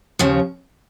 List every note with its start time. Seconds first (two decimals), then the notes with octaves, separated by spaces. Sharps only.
0.19 D#2 C#3 F3